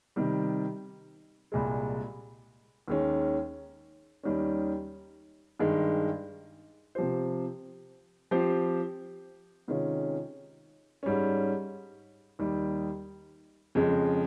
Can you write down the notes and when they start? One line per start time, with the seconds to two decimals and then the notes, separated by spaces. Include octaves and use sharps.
0.16 C3 D#3 G3
1.52 C2 A#2 G#3
2.88 D#2 D#3 G#3 C#4
4.23 D#2 D#3 G3 C#4
5.59 G2 D#3 G#3
6.95 C3 F3 C4 G4 C5
8.31 F3 C4 G4 C5
9.68 C3 D#3 G#3 C#4 F4
11.03 G#2 G3 C#4
12.39 D#2 D#3 G3
13.75 F2 C#3 G#3